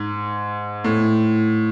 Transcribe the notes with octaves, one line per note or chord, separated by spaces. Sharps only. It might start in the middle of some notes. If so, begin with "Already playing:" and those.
Already playing: G#2
A2